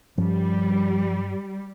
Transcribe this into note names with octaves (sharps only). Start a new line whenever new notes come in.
G2 F3 G3 C#4